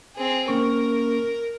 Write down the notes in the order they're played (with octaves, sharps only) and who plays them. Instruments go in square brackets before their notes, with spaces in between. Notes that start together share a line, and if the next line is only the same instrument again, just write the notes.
[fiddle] C4 G#4
[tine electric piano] A#3 C#4 C#6 [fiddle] A#4